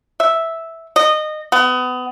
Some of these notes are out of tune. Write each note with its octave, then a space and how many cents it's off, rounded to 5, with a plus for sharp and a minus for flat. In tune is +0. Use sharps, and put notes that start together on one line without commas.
E5 -5
D#5 -20
B3 +30